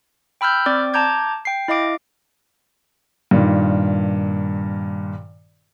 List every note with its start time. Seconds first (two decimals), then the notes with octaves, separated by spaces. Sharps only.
0.41 G5 B5 E6 F6 G6
0.66 C4 D5 D6
0.94 A5 A#5 D6 G6 G#6
1.45 G5 C7
1.68 E4 D#5 F5 D6 D7
3.31 G2 A#2 D#3